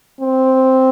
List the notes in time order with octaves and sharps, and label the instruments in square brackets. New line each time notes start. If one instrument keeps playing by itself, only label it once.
[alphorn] C4